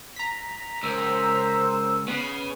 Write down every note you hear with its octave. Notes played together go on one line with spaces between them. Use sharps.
A#5 B6
C#2 A#4 C5 E6
C#3 B3 B4